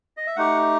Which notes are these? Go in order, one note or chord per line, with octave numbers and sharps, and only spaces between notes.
D#5
E5
A3 D#4 G4 F#5